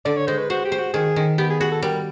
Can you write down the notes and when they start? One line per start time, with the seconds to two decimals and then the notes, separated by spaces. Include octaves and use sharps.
0.05 D3 D5
0.17 C#5
0.27 G#3 C5
0.39 B4
0.50 F#4 C5
0.65 G4
0.72 C5
0.79 F#4
0.94 D#3 G#4
1.16 D#3
1.38 B3 G4
1.50 G#4
1.60 F#4 G#4
1.72 A4
1.82 G3 A#4